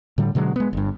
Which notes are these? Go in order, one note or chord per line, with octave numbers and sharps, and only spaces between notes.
A2 D3 G3
B2 D3 F#3 G#3
G#3 B3
G1 G2